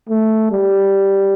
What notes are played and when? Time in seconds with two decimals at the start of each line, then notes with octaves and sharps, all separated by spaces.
0.09 A3
0.51 G3